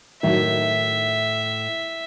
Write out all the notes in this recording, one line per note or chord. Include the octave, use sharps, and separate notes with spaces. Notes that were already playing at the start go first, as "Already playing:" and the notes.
A2 D#3 F#3 E5